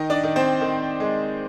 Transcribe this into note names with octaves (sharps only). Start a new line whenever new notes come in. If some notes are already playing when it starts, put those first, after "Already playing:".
Already playing: D#3 D#4 D#5
D4 D5
D#3
C4 C5
D#3
G#3